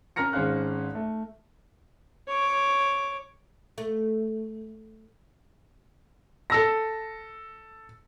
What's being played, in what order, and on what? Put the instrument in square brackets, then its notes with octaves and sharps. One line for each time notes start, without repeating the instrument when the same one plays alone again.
[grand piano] C#4 A#4 A#5 F6 A#6 C#7
G#1 G#3 C#4 C5 F5 F#6
A3
[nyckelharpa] C#5 D6
[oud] A3
[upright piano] A4 E6 A#6